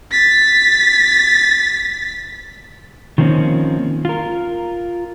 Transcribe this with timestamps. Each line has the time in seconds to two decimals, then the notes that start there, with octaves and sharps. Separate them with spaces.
0.11 A6 B6
3.18 D#3 F3 A#3 C4 C#4
4.05 F4 A#4